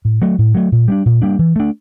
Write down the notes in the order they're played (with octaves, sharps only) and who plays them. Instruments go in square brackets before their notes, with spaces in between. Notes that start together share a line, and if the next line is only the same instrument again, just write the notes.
[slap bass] A2
F#3 A3
A2
F#3 A3
A#2
G3 A#3 D4
A#2
G3 A#3 D4
E3
A3 D4